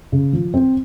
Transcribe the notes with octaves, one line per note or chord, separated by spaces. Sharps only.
C#3
F3
C4